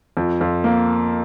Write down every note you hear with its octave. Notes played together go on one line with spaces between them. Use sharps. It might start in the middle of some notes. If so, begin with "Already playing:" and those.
F2
F2
A#3